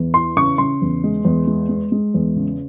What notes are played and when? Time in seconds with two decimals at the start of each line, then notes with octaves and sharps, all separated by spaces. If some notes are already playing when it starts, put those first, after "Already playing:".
Already playing: E2
0.14 E3 C6
0.36 C#3 C#6
0.58 C#3 C6
0.82 E2
1.04 G#3
1.25 E2
1.47 G#3
1.69 G#3
1.92 G#3
2.14 E2
2.36 C#3